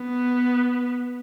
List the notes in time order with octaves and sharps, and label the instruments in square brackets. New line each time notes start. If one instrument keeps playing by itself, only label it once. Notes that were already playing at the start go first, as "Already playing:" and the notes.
Already playing: [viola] B3